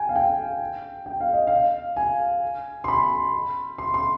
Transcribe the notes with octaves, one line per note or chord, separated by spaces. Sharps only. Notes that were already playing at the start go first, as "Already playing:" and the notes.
Already playing: G5 G#5
F5
G5
G5
F5
D#5
F5
G#5
C6
B5
C6
C6